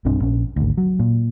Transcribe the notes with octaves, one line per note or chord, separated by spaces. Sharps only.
B1 G2 C4 D4
A#1 C#4
G#1 D2
F#3
A#2